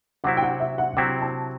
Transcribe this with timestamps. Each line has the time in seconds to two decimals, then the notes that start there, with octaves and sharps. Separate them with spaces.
0.24 C3 F#3 C4 E4 F#5
0.37 G5
0.43 F#5
0.60 E5
0.78 F#5
0.97 C3 F#3 C4 E4 G5
1.21 A5